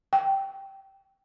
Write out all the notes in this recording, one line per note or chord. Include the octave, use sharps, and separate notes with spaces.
G5